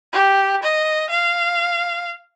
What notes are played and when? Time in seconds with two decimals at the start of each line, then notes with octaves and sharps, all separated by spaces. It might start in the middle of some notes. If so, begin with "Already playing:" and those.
0.12 G4
0.63 D#5
1.09 F5